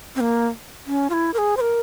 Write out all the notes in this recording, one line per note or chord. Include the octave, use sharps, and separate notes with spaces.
C4
A#3
C#4
F4
E4
A#4
G#4
C5
A#4